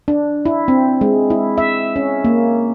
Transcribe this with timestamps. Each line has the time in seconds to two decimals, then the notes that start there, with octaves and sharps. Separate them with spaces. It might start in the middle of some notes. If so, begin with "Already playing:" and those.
0.08 D4
0.46 E4
0.68 C4
1.01 G#3
1.30 E4
1.58 E5
1.96 C#4
2.25 A#3